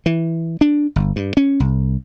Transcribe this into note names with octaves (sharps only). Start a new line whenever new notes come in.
E3
D4
G1
G2
C#4
C2